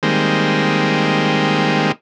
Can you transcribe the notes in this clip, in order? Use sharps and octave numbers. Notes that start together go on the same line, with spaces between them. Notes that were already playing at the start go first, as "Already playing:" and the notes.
D#3 G3 G#3 A#3 C4